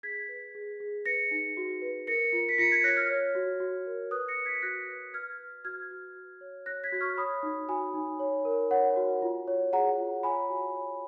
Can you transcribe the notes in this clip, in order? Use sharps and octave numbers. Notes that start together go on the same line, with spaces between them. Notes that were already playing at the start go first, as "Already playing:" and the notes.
G#4 G#6 B6
B4
G#4
G#4
B4 A#6 C#7
D#4
F#4
B4
A#4 A#6 C#7
F4
B6
F4 A#6 C#7
G#6 B6
C#5 F#6 A#6
F6 G#6
C#5
F#4
F#4
A#4
B4 D#6 F#6
A#6 C#7
B4
G#6 B6
F#4 F#6 A#6
B4
B4 F6 G#6
B4
F#4 F6 G#6
F#4
F#4
C#5
C#5 F#6 A#6
G#6 B6
F#4
C#6 F6
C#5 B5 D#6
D#4
F#4 G#5 B5
D#4
C#5
A#4
C#5 F#5
F#4
F4
C#5
G#4 F#5 A#5
F4
C#5 G#5 B5
F#4
C#5